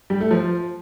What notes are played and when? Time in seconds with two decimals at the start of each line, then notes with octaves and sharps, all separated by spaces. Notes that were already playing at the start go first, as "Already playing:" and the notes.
0.10 G3
0.20 A3
0.31 F3